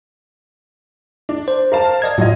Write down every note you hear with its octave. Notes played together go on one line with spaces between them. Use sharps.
D4
C5
A#4 F5 A5
D5 D#5 G#6
A2 F#3 F4 D#5